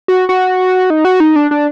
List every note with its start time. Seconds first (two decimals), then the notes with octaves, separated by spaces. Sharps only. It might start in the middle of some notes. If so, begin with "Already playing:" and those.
0.08 F#4
0.29 F#4
0.90 D#4
1.05 F#4
1.20 D#4
1.36 D4
1.51 D4